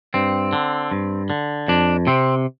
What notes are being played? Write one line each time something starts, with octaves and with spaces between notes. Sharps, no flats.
G2 C4
D3
G2
D3
F2 D4
C3 C4